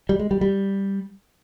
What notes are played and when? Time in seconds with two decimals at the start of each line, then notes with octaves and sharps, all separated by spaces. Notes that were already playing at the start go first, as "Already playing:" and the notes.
0.09 G3
0.19 G#3
0.31 G3
0.41 G3